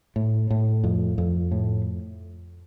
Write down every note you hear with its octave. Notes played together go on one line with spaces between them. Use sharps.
A2
A2
F2
F2
A2